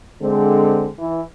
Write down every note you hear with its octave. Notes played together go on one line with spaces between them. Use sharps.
D3 G#3 C4
E3